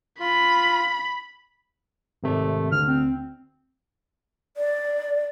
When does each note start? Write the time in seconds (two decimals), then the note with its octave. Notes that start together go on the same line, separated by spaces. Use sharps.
0.20 F4 B5
2.23 G#1 C3 A3
2.72 D2 F6
2.86 C4
4.57 D5